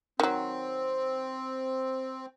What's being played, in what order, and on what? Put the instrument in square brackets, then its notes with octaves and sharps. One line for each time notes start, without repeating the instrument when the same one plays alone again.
[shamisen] D#3 F#3 [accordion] C4